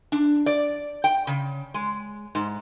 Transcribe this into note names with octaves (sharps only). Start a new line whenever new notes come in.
D4
D5
G5
C#3
G#3
G#2